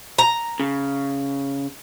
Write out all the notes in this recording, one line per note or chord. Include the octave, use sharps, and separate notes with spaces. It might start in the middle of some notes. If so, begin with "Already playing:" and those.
A#5
C#3